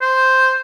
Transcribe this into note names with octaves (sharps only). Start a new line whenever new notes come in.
C5